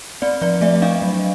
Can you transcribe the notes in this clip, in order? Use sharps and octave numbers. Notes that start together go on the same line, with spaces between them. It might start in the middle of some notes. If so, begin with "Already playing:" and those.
C4 D5
F3 D5
A3 D5 E5
D4 D#5 F5
F#3